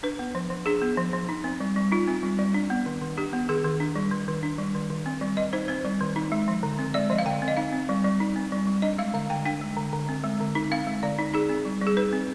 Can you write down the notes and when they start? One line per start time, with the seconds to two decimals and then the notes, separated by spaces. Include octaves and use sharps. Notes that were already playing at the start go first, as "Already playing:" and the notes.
0.03 D4 B4
0.19 B3
0.35 F3
0.50 F3
0.66 D4 G#4
0.82 B3
0.98 F3
1.13 F3
1.29 D#4
1.44 C4
1.60 G3
1.76 G3
1.92 D#4 F4
2.08 C4
2.23 G3
2.39 G3
2.54 D4
2.70 B3
2.86 D#3
3.01 D#3
3.17 D4 G4
3.33 B3
3.49 D#3 G#4
3.65 D#3
3.80 D4
3.95 G3
4.11 D#3
4.28 D#3
4.43 D4
4.58 G3
4.75 D#3
4.90 D#3
5.06 C4
5.21 G3
5.37 D#3 D#5
5.53 D#4 C5
5.68 C4 C5
5.85 G3
6.00 D#3
6.16 D#4
6.32 G#3
6.48 F3
6.63 D3
6.79 C4
6.94 G#3 D5
7.10 F3 D#5
7.19 F5
7.25 D3 G5
7.42 C4
7.48 D#5
7.57 D#4 F5
7.73 C4
7.89 G3
8.04 G3
8.20 D#4
8.36 C4
8.52 G3
8.67 G3
8.82 D4 D#5
8.98 G#3 F5
9.14 D3 F5
9.30 D3 G5
9.45 D4 G5
9.61 G#3
9.77 D3
9.93 D3
10.09 C4
10.24 G#3
10.40 D3
10.55 D#4
10.71 C4 F5
10.87 G#3
11.03 D3 D5
11.19 D#4
11.34 D#4 G#4
11.49 C4
11.65 G3
11.81 G3
11.87 G#4
11.97 D#4 B4
12.13 C4